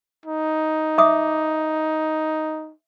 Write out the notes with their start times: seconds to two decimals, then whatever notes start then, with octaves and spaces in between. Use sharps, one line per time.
0.25 D#4
0.98 E5 D6 D#6